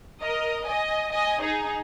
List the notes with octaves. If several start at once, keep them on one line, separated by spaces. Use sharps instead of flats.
A#4 D#5
D#5 G#5
D#5 G#5
D#4 G#4